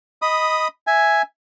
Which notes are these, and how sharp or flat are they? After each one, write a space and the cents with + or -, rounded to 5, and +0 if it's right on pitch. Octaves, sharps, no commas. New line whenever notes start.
D#5 +15 B5 +0 D#6 +0
E5 +0 G#5 +0